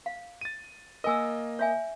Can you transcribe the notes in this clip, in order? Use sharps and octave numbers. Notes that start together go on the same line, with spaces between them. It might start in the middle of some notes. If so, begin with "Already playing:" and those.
F5
A6 D#7
A#3 A#4 D#5 G#5 E6
C#5 E5 G#5